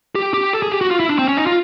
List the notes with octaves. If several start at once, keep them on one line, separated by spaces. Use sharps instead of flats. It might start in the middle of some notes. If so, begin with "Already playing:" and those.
G4
G4
A4
G#4
G4
F#4
F4
E4
D4
C4
C#4
D#4
F4